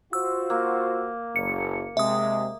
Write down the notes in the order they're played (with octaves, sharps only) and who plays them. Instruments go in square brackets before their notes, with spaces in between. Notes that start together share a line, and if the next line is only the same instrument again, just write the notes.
[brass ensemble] F4 F#4 C5 [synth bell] E6
[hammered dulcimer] A#3
[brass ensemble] F#1 [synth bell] C#7
[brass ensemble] C3 G#3 [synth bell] E5 D#6